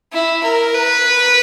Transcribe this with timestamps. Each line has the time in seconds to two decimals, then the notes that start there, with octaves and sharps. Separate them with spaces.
0.13 E4
0.43 A#4
0.74 B4